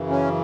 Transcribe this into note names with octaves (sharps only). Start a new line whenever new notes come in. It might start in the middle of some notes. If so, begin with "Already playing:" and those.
Already playing: F#2 C#3 E3
C#4